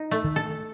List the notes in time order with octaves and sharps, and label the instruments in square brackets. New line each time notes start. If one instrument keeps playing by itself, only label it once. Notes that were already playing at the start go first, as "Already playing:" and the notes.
Already playing: [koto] D#4
A3
[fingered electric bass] D#3
[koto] A4